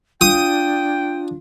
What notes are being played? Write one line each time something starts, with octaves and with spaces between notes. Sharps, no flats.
D4 F4 G5 D#6